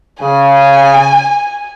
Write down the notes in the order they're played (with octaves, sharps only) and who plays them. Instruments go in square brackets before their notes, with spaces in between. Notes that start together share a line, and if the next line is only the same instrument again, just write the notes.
[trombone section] C#3 [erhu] G#5